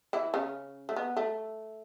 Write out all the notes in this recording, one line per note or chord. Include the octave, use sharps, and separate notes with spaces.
E3 E4
C#3 C#4
A3
B3
A3